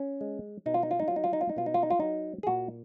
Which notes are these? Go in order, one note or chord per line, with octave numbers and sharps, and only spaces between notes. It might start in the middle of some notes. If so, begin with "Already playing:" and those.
Already playing: C#4
G#3
B2 D#4
F4
D#4
F4
D#4
F#3 F4
D#4
F4
D#4
F4
D#4
B2 F4
D#4
F4
D#4
F4
F#3 D#4
G#4
A#2 F#4